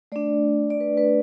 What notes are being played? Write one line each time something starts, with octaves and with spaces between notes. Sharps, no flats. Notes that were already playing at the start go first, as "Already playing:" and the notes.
A3 D4 D5
D5
B4
B4